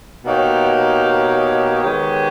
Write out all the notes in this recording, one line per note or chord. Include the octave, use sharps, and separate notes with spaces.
B2 A#3 D#4 G4 C#5
D#3 G#3 B3 G4 C#5